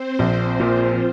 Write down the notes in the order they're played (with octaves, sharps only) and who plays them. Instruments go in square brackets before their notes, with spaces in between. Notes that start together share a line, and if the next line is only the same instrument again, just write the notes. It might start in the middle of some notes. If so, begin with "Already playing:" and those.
Already playing: [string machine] C4 C5
[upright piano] A#1
[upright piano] A#2 [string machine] F3 F4